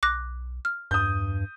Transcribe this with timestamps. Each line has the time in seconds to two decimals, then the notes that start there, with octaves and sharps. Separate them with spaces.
0.03 B1 D6 F#6 A#6
0.65 F6
0.91 E2 G2 D#6 G6